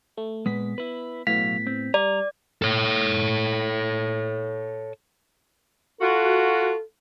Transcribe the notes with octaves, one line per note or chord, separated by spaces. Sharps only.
A3
A#2 G#3 B3 B6
E4 B4
B1 A2 F#3 B3 F5 B6
C4
G3 D5 A#5
A4 C#5
F4 F#4 A4